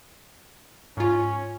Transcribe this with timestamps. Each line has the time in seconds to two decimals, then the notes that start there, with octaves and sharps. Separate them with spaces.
0.97 G#2 C#4 F4